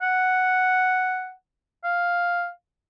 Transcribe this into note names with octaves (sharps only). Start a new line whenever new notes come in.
F#5
F5